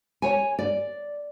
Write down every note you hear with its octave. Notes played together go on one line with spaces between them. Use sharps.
C#5 G#5
D5